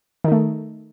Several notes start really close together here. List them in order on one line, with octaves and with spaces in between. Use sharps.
D#3 D#4 A3